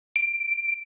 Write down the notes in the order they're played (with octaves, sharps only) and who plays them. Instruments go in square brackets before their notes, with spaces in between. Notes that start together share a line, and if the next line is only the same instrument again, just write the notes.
[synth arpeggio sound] D7